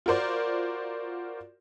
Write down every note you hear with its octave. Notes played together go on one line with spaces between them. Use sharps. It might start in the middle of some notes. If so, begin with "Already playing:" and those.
F4 F#4 A#4 C5 D5